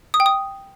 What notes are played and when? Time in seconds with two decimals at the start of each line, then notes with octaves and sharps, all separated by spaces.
0.14 D#6
0.20 G5
0.26 D#6